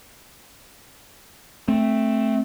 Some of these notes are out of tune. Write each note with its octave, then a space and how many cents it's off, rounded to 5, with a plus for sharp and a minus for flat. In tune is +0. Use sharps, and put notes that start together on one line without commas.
A3 +0 C4 +10